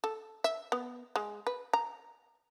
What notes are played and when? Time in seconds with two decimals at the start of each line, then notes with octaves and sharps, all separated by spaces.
0.04 A4
0.44 E5
0.72 B3
1.16 G#3
1.47 B4
1.73 A#5